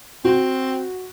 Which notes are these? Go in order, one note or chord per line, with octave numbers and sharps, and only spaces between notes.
C4 F#4